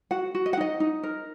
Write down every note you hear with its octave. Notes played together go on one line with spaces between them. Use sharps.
F#4 F#5
F#4
D#5
F#5
D#4 D#5
D#4
A#4